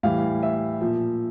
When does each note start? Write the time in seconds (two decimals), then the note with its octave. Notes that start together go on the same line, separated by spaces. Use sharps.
0.03 A2 E3 G3 F5
0.43 E5
0.81 A#2 F3